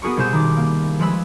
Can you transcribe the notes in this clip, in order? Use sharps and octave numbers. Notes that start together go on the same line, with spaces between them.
B3 F#4 G#4 A#4 C#6
C2 B2 G#4 C5 G6 E7
D#3 D6
A#3
F3 G#3 B4 E6